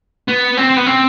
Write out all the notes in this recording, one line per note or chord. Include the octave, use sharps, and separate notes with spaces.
B3
C4
B3
C4